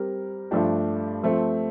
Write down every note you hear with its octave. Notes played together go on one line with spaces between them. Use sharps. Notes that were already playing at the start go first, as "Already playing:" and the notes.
Already playing: G3 C4 G4 A#4
G2 F3 A3 D4 G4
F3 A3 C4